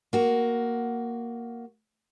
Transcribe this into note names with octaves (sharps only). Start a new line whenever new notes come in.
A#3 F#4